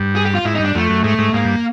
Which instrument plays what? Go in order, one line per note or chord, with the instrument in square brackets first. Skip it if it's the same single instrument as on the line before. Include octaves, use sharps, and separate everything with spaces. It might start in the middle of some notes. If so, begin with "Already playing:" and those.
Already playing: [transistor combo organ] G2
[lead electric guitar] G#4
G4
F4
[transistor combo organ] G#2 [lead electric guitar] E4
[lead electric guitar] D#4
[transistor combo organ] G2
[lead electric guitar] D4
[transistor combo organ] F2 [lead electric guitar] A3
[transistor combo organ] F#2
[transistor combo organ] G#2 [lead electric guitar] A3
[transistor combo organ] G#2
[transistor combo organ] G#2 [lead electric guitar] A#3
[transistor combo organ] G2